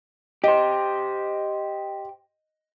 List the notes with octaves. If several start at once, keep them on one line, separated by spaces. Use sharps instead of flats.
G4 C5 D#5